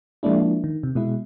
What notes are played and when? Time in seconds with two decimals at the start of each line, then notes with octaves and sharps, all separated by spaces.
0.23 F3 G#3 A#3 D4 E4
0.64 D#3
0.83 C3
0.95 B2 G#3 E4